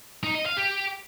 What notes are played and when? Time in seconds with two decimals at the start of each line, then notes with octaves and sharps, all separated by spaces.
0.24 D#4
0.35 D#5
0.46 F5
0.57 G4